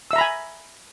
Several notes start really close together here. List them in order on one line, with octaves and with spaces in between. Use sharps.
E6 E5 A#5 B5 G#5